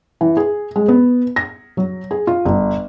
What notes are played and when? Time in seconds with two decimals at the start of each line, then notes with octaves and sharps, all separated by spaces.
0.21 E3
0.37 G#4
0.76 G#3
0.88 B3
1.36 A#6
1.77 F#3
2.11 G#4
2.27 F4
2.45 G1